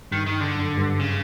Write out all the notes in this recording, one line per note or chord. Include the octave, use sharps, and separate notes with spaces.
G2 D#3
D#3
D3
F#2
G2
C#3